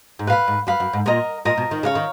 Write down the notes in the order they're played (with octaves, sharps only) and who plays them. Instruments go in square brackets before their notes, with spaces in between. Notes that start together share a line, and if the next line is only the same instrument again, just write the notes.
[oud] G#2
[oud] A#2 [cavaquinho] B4 F5 B5
[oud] G#2
[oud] F#2 [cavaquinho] B4 F5 B5
[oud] F#2
G#2
[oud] A#2 [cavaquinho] A#4 D#5 A#5
[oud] A#2 [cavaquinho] A#4 D#5 A#5
[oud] B2
D#3
[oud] C#3 [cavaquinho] C#5 F5 A#5
[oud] D#3